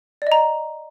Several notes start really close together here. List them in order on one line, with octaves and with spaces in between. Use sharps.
D5 D#5 A#5